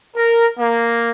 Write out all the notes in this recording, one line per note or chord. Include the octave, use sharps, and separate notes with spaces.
A#4
A#3